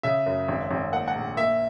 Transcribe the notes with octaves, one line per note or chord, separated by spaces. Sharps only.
C#3 E5
F#2
G#1
G#1
A#3 F#5
F#5
A#1
A#3 E5